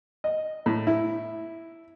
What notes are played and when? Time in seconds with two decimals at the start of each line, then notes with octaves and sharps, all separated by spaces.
0.24 D#5
0.66 A2
0.87 E4